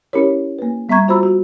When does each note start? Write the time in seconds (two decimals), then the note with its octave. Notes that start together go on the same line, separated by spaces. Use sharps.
0.13 C#4 E4 G4 A#4 C#5
0.59 A#3 B4
0.89 G3 B3 E5 A#5 C#6 G#6
1.08 F4 F#4 C5 A#5 B5 E6
1.23 F#4